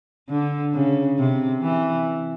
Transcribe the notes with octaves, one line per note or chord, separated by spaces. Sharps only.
D3
C#3
C3
E3